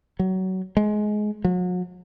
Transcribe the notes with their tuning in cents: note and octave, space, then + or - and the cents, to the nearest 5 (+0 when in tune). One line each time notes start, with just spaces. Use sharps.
F#3 +20
G#3 +20
F#3 -40